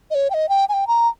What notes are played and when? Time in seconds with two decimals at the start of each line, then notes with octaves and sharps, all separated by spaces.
0.11 D#5
0.15 C#5
0.30 G5
0.34 D#5
0.49 G5
0.69 G#5
0.73 G5
0.87 A#5